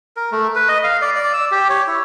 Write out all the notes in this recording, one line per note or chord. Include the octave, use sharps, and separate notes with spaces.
A#4
A3
B4
D#5
F5
D5
D5
E6
G4
C#5
E4